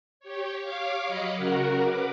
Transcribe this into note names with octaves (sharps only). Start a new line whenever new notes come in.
G4 C#5
C#5 F5 D6
F#3 D#5 B5 C#7
C#3 F#4 A#4 F#5
B4 D6